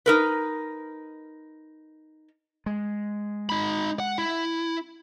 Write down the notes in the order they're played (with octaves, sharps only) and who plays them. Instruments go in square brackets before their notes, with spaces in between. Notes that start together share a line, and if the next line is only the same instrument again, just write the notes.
[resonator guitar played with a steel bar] D#4 A#4 B4
[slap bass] G#3
[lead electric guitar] D#4 B5
F#5
E4